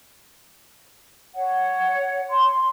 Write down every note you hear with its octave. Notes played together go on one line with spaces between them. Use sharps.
C#5 F#5
C6